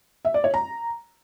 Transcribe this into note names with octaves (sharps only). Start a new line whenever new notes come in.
E5
D5
C#5
A#5